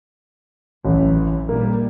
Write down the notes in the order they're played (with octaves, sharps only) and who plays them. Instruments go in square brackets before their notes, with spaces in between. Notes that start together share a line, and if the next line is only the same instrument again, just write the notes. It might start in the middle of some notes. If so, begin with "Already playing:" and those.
[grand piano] A1 [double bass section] F#2 C3 E3
[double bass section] A#2 G3 [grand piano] A#3